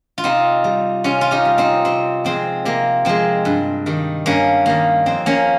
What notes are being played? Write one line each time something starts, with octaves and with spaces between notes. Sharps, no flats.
F4
C3 C4 D#4
G3
C3 C#4 F4
F4
D#4 G4
G3
C4 D#4
C3 C4
F3 G#3 C4
C3 A#3
F3 G#3 C4
G2
D#3 G3
G2 A#3 C#4
D#3 G3 A#3
F2 C4
A#3 C#4